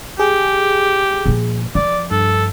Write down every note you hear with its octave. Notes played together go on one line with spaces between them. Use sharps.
G4 G#4
A#2 F3
F3 D5
G2 A4